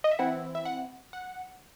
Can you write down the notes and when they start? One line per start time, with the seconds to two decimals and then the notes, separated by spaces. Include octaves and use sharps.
0.04 D#5
0.11 E5
0.19 E3 C4 E4 F#5
0.55 E5
0.65 F#5
1.13 F#5